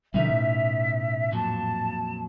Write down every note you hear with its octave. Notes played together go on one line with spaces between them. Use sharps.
B2 D3 F3 G3 C#4 D#4 E5
A2
F2 A#2 F#3 A5